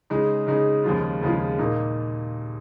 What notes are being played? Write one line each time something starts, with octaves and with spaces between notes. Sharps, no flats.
C#3 G#3 D#4
C#3 G#3 D#4
D#2 C#3 F3 G#3 F4
D#2 C#3 F3 G#3 F4
A#2 A#3 D#4